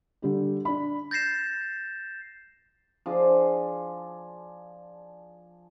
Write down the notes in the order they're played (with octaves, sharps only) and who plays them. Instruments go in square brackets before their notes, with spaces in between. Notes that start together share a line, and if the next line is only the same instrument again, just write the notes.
[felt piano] D3 G3 G4
D4 B5
[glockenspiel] G6 A6 A#6 C7 E7
[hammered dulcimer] F3 D4 G#4